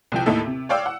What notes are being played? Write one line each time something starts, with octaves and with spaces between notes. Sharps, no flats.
C2 F3 G5
D#2 A2 A#3 D#4 A4 E5
C3
C#5 D5 F5 G5 D6 E6
F#5